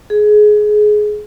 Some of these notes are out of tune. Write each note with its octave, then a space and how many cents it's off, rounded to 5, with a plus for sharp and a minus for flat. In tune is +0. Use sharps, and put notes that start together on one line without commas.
G#4 +20